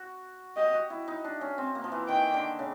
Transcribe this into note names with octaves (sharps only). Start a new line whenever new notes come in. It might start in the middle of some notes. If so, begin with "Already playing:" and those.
Already playing: F#4
G4 D#5
F#4
E4
D#4
D4
C#4
C4
A#3
F3
E3
D#3 G5
D3
C#3